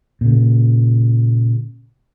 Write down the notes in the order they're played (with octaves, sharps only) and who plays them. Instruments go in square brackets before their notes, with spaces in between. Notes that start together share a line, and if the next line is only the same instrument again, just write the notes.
[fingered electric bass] A#2 C#3